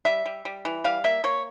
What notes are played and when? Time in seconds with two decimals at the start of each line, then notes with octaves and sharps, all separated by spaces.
0.05 G3 E5
0.26 G3
0.45 G3
0.65 E3
0.84 G3 F5
1.04 A#3 E5
1.24 A#3 C#5